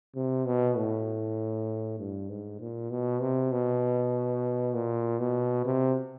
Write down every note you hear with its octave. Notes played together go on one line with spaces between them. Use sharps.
C3
B2
A2
G2
G#2
A#2
B2
C3
B2
A#2
B2
C3